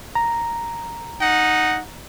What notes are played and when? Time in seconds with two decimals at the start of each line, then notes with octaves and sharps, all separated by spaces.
0.15 A#5
1.21 D#4 F#5